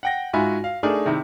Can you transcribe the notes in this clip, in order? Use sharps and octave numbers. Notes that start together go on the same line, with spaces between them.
F#5 G5 A#6
G#2 F4 F#4 E5 G#5 B5
F5
A3 D4 D#4 G#4 A#4
C3 D#3 E4